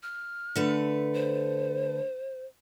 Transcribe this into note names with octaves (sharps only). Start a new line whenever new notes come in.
F6
D3 A3 B4
C5